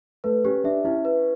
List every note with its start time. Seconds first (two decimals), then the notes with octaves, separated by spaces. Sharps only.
0.24 A3 B4
0.44 C#4 G4
0.64 D4 E5
0.85 C#4 E4
1.05 B4